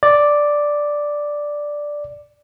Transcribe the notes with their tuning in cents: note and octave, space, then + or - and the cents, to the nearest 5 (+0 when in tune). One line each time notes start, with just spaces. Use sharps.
D5 +0